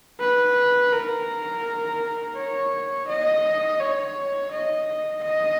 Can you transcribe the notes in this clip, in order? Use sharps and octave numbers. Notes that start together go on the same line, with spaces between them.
B4
A#4
C#5
D#5
C#5
D#5
D#5